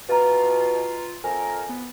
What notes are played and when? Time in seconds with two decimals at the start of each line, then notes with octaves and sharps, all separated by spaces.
0.09 B2 F4 B4 A#5
1.24 F2 A#4 G#5
1.69 B3